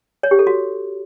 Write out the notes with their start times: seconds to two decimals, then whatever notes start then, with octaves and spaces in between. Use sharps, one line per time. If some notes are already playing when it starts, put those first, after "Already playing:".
0.23 C#5
0.31 G4
0.39 A4
0.47 F#4